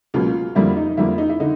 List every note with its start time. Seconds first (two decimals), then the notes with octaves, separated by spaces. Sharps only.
0.14 C#2 B2 F#3 A#3 F4
0.55 F2 D3 G3 A#3 E4
0.76 D#4
0.97 F2 D3 G3 A#3 E4
1.18 D#4
1.29 E4
1.40 D3 D#4